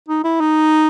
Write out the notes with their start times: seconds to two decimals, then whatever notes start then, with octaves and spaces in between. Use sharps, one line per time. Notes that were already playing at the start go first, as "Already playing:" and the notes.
0.09 D#4
0.24 E4
0.41 D#4